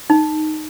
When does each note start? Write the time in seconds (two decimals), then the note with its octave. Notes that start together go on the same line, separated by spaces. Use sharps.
0.10 D#4